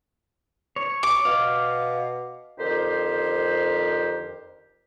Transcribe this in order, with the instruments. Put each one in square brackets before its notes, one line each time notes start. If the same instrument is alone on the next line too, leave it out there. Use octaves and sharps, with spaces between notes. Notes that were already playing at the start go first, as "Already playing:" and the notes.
[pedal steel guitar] C#5
[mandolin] D6
[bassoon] B2 [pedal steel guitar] F5
[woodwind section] F2 D3 D#3 G4 C5